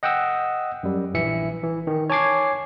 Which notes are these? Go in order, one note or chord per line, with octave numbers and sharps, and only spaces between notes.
D#5 F#5 G5 D#6 E6
F#2 G3
A#1 E3 E5 C#7
E3
D#3
C#5 G#5 A5 D6 G#6 C7